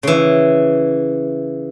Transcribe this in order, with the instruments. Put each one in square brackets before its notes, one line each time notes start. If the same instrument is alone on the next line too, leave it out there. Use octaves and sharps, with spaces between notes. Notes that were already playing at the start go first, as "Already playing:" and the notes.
[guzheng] C#3 E3